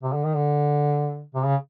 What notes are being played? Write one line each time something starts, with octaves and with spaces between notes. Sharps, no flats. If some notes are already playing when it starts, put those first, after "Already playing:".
C3
D3
D#3
D3
C3
C#3